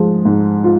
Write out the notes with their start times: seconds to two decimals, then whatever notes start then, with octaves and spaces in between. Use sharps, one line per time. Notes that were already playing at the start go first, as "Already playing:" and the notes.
Already playing: G#2 F3 G#3 F4
0.25 G#2
0.64 F4